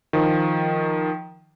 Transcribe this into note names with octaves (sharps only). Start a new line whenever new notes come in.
D#3 F3